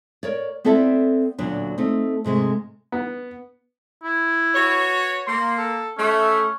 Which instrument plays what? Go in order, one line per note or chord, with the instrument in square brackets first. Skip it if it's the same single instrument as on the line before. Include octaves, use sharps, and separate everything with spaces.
[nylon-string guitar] A#4 C#5 D5
B3 C4 E4 A4 D5 E5
D2 A#2 C#3 F#3 B3 D4
A3 C4 D#4
G#2 C3 G#3 A3
[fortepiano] B3
[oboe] E4
[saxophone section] F#4 B4 C#5
[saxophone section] A#3 [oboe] C6
[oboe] A4
[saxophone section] A3 [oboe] C#4